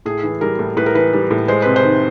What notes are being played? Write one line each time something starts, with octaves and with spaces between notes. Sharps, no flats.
A2 G#4
E3
G3 A#4
A2
A2 B4
A#4
E3 B4
G3
A2
G#3 C5
C3 B4
C5
D#3